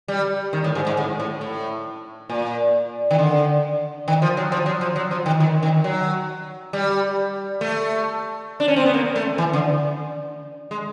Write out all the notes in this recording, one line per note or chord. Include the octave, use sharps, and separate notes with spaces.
G3
D#3
A2
G#2
G#2
A2
A2
A2
A#2
D#3
D3
D#3
F3
F#3
F3
F#3
F3
F#3
F3
D#3
D#3
D#3
F#3
G3
A3
D4
C#4
C4
B3
A#3
A3
E3
D3
G#3